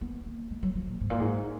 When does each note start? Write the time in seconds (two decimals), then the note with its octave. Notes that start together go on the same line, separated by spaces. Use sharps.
0.01 B3
0.26 A#3
0.50 G#3
0.63 F#3
0.75 F3
0.87 A#2
1.01 G#2
1.10 A#2
1.20 G#2